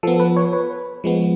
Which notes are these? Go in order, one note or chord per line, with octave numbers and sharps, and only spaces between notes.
F3 B3 A4
B4
C#5
B4
F3 G#3 B3